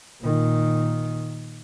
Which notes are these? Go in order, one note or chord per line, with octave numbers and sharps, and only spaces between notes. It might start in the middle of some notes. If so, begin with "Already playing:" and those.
A#2 D#3